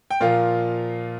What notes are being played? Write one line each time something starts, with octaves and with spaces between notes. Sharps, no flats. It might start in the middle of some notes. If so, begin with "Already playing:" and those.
G5
A#2 F3 A#3 F4 F5